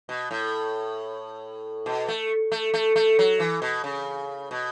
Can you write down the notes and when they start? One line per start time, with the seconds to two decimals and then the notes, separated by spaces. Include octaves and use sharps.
0.09 B2
0.31 A2
1.86 B2
2.08 A3
2.52 A3
2.74 A3
2.96 A3
3.19 F#3
3.40 E3
3.62 B2
3.84 C#3
4.51 B2